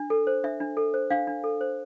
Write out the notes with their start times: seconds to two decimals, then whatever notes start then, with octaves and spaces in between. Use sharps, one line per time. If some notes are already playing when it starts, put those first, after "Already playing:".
Already playing: D4
0.10 A4
0.27 C5
0.44 D4 E5
0.60 D4
0.77 A4
0.94 C5
1.10 D4 F5
1.27 D4
1.44 A4
1.61 C5